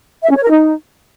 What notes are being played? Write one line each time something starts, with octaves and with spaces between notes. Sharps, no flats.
E5
C#4
C#5
A#4
D#4